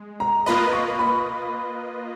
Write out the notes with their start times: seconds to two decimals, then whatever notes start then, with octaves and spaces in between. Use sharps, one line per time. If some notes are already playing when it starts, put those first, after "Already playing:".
Already playing: G#3
0.20 A#5
0.46 A#3 F4 B4 D#5 B5
0.73 C#6
0.99 B5